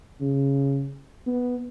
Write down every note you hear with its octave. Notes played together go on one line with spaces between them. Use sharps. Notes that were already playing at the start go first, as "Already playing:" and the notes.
C#3
B3